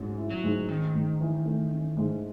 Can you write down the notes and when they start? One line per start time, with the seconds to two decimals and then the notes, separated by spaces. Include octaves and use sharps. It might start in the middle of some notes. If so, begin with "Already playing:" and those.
Already playing: G#2 F#3 C#4
0.18 E4
0.30 F#3
0.44 G#2
0.69 D#3 C#4
0.95 G#2
1.21 E3
1.45 A3
1.72 C#4
1.97 G#2